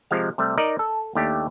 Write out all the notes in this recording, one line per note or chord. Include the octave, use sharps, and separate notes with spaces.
C3 F3 G#3 F5
C3 G3 A3
D#4 A#4 D5 D#5
A4
D#2 A3 D4 G4